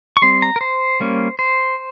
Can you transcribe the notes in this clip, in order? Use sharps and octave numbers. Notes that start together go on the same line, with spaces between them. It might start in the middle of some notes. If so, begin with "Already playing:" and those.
C#6
G3 C4 C6
A#5
A#4
C5
G3 A#3 C#4
C5